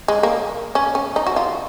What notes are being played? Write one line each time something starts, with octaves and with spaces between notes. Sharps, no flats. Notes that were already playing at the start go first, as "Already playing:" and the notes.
G#3
A#3
C#4
C#4
D#4
F#4
F4